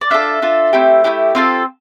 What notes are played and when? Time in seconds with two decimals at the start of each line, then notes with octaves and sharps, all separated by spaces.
0.01 D5
0.10 D4 F4 A4 E5
0.42 D4 F4 A4
0.73 A3 C4 E4 G4
1.04 A3 C4 E4 G4
1.35 C4 F4 A4